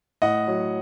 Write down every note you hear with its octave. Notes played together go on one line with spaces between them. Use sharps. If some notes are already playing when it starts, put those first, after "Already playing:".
A2 D#5 F#5
F#3